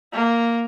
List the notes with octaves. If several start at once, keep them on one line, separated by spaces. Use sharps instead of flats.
A#3